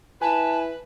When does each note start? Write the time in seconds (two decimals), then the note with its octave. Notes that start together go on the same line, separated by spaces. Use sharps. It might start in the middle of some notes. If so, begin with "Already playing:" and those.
0.22 E4 B4 G#5 A5